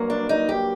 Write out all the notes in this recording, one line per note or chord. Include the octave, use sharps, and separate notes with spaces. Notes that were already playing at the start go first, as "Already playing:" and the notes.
Already playing: G2 F#3 A#3
D4
D#4
G4